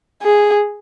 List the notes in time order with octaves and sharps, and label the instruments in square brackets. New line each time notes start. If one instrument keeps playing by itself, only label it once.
[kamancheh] G#4